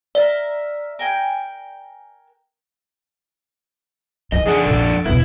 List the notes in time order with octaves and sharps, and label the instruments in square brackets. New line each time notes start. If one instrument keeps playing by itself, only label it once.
[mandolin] A#4 E5 [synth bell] D5
[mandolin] A#4 G5 G#5
[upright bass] E3 [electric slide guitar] D#5
[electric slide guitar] F2 D4 F#5 [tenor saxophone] G#4
[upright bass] A#1 [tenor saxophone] A4
[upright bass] E2 B2 [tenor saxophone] B3 [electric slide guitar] E4